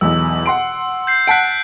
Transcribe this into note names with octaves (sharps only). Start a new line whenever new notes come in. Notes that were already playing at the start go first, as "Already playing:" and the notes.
B1 E2 B2 E6
F#5 C6 D7
G6 C7
F#5 A5 F#6 B6 D7